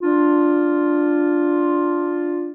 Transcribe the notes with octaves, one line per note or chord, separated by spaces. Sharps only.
D4 F4